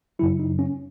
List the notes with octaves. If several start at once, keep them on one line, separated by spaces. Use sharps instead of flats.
F#2 C#3 F#3 E4
D#4
C#4